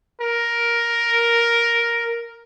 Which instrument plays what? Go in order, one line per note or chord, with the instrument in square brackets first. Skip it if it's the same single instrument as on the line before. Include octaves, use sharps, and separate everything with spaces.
[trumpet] A#4